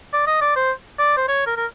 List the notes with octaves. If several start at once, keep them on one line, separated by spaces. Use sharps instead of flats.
D5
D#5
D5
C5
D5
C5
C#5
A#4
A#4